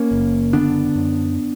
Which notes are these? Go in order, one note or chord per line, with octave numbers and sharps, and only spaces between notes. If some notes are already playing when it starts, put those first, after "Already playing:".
Already playing: A#3 C#4
F#1
D3 B3 D4
F#2